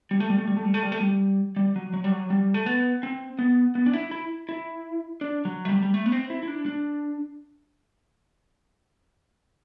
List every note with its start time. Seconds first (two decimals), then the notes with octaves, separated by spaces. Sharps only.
0.11 G3
0.20 A3
0.30 G3
0.38 A3
0.47 G3
0.57 A3
0.64 G3
0.74 A3
0.83 G3
0.92 A3
1.00 G3
1.56 G3
1.76 F#3
1.93 F#3
2.04 G3
2.12 F#3
2.30 G3
2.54 A3
2.66 B3
3.03 C4
3.39 B3
3.75 B3
3.86 D4
3.93 E4
4.11 E4
4.49 E4
5.21 D4
5.45 F#3
5.65 A3
5.69 G3
5.82 G3
5.94 A3
6.06 B3
6.12 C4
6.30 E4
6.43 E4
6.48 D4
6.66 D4